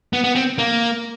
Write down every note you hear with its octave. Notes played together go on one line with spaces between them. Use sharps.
B3
B3
C4
A#3